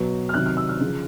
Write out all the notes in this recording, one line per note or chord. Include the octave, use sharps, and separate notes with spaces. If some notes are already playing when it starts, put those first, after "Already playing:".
Already playing: B2 F#3
F6
C3 D#3 F#3 F#6
F6
E6
F6
C#3 F3